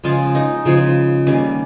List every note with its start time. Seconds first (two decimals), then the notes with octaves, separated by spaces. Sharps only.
0.04 C#3 F3 G#3 F4
0.35 D#4
0.65 C#3 F3 G#3
1.27 D#3 G3 A#3 C#4